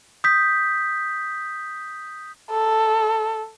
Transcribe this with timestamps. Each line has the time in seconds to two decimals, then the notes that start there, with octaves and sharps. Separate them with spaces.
0.24 D#6 G6 B6
2.51 A4